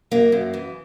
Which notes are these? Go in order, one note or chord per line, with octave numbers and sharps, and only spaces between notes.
F#2 A#3
F#2
E3